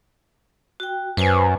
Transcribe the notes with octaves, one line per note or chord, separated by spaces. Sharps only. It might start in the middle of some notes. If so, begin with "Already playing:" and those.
F#4 G5
F#2 B4 C5 G#5